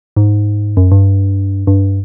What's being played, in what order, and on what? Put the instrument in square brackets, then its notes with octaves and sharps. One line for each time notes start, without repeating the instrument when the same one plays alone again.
[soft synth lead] G#2
F#2
G2
G2